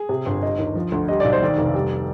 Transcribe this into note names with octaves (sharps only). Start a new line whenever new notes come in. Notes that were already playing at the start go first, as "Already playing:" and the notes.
Already playing: G#4
C3
G1
G3 D#5
D#2
F3
D2
G3 D#5
B1 D5
C5
D#3 D5
F1
G3